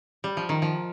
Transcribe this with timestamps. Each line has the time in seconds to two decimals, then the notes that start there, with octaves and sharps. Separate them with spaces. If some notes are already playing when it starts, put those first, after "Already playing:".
0.24 G3
0.37 F3
0.49 D#3
0.62 F3